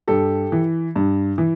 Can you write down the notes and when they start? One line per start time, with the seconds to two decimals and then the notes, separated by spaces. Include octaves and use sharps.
0.08 G2 G4 A4
0.52 E3
0.96 G2
1.38 E3